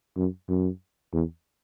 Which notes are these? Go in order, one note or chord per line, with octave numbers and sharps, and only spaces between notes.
F#2
F#2
E2